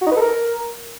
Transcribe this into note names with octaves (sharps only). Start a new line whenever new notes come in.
F#4
D#4
B4
A4
A#4